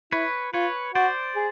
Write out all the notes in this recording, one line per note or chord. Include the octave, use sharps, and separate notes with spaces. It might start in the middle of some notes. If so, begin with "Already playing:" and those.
E4 B4 C#5
F4 B4 C#5
F#4 C5 D5
G#4